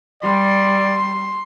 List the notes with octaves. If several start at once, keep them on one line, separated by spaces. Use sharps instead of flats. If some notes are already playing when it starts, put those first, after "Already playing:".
G3 D5 C6